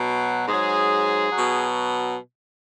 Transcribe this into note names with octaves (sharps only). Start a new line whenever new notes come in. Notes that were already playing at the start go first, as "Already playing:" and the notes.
Already playing: B2 F#3
G#2 F#3 G#4
B2 F#3